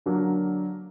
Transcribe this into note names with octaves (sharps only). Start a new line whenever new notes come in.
D3 F#3 A#3 D4